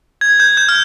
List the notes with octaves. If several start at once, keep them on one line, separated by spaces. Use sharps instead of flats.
G#6
G6
G6
F6